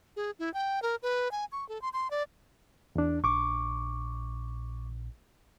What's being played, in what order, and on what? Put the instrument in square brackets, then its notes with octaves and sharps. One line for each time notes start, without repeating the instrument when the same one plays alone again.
[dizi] G#4
E4
G5
A#4
B4
G#5
C#6
A4
C6
C6
D5
[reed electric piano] E2 D4
[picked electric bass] A#1 D4 [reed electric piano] C#6 D6